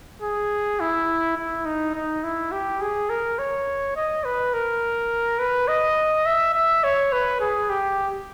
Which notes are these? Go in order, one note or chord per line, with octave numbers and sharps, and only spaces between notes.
G#4
E4
E4
D#4
D#4
E4
G4
G#4
A#4
C#5
D#5
B4
A#4
B4
D#5
E5
E5
C#5
B4
G#4
G4